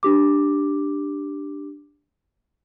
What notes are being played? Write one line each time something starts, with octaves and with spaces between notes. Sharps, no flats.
D4 G4 D6